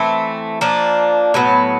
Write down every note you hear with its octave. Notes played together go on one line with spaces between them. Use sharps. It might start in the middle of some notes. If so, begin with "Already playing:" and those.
Already playing: E3 A3 C4
F3 A#3 D4
A2 F#3 B3